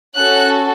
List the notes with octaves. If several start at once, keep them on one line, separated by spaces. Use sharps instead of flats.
C#4 F#4 A4 F#6